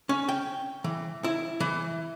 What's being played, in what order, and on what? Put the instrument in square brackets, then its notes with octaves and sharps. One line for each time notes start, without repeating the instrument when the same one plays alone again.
[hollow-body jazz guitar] C#4
G5
E3
E4
E3